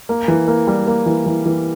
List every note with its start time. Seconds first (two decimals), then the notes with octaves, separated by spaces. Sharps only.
0.09 A#3
0.28 E3
0.48 A#3
0.67 G3
0.87 A#3
1.06 E3
1.26 E3
1.46 E3